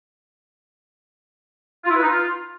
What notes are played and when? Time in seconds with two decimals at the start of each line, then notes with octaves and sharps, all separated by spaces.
1.84 F4
1.90 E4
1.96 B4
2.02 D#4
2.07 F4